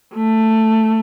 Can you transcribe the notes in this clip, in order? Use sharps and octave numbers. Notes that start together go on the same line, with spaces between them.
A3